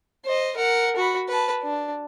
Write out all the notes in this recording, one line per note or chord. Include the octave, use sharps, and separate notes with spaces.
C5 D#5
A#4 F#5
F#4 B5
B4 A5
D4